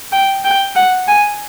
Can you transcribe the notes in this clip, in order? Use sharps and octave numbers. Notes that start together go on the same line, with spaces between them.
G5
G5
F#5
G#5